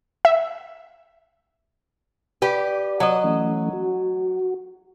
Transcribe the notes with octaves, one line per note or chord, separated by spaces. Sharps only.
E5
G4 B4 D5
F#3 D#5
E3 A3 C#4
F#4